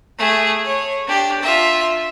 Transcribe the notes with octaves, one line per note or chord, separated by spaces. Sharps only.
A3 G#4
C#5
D4 G4
F4 E5